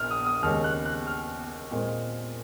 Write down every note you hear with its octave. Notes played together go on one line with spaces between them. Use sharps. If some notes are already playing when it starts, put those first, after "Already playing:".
Already playing: A#1 A#2 F6
D#6
D#6
D#2 C#3 G#3 C#4 F6
F#6
F#6
F6
A#2 G#3 C4